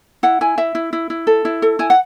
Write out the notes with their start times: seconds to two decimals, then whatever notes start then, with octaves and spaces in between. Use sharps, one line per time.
0.23 E4 F#5
0.41 E4 G#5
0.58 E4 E5
0.75 E4
0.93 E4
1.10 E4
1.27 A4
1.45 E4
1.62 A4
1.79 E4 G#5
1.90 F#5